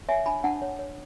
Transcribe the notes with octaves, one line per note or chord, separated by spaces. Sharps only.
C#5 E5 G#5
D4 G#5 B5
D4 F#5 A5
C#5
C#5